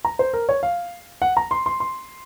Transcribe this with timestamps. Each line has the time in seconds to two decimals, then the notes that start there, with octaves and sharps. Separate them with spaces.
0.05 A#5
0.19 C5
0.33 A#4
0.49 C#5
0.63 F5
1.22 F#5
1.37 A#5
1.51 C6
1.66 C6
1.80 C6